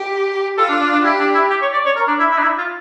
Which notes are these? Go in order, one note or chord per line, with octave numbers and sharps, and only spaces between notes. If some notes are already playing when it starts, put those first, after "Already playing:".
Already playing: G4
F4 A4
D4
D4
D4
E4 G4
D4
E4
G4
C#5
D5
C#5
A#4
D4
E4
E4
D4
E4
F4